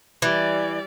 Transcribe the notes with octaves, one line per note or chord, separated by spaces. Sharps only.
E3 G3 D5